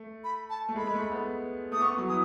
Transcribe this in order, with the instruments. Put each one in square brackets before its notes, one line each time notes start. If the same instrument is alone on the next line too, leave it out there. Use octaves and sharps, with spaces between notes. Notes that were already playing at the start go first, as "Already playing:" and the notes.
Already playing: [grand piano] A3
[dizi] B5
A5
[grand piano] A3
[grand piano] G#3 [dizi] B5
[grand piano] G#3
A3
B3
[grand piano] A3 [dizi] D#6
[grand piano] B3 [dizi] C#6
[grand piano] F#3
[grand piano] E3 [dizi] D#6